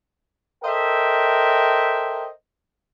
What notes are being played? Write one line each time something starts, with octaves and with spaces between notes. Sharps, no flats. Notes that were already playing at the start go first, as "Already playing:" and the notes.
A4 A#4 C5 D#5 E5 G5